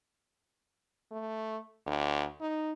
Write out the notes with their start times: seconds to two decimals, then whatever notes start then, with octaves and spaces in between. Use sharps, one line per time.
1.11 A3
1.86 D2
2.40 D#4